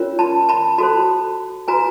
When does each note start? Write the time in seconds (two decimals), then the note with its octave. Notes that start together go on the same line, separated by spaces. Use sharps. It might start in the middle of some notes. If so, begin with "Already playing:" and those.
Already playing: C#4 F4 A#4 C#5
0.19 A5 B5
0.49 A5 B5
0.78 F#4 A4 C5 A5 B5
1.68 F#4 B4 G#5 A#5